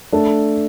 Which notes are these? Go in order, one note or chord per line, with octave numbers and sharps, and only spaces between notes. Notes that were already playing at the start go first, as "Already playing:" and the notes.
A3 D4 A4